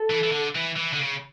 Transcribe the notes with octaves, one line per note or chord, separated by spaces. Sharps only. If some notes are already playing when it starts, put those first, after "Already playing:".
Already playing: A4
E3
E3
D3
E3
E3
D3
C#3